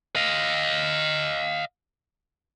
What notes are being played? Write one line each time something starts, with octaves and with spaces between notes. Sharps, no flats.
D#5 F5